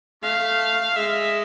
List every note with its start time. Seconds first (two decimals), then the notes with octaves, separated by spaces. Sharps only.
0.23 A3 F5
0.96 G#3 E5